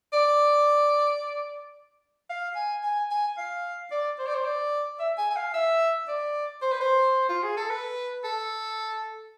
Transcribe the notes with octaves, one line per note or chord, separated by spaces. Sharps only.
D5
F5
G#5
G#5
G#5
F5
D5
C5
D5
C5
D5
E5
G#5
G#5
F5
E5
D5
C5
B4
C5
F4
G#4
A4
B4
A4